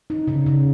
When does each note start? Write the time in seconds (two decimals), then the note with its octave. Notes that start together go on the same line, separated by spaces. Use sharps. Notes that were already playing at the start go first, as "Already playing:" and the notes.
0.10 D#4
0.28 C#3
0.46 C#3